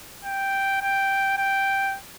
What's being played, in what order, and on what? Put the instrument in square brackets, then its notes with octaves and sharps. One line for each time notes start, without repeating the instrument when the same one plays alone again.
[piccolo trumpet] G5
G5
G5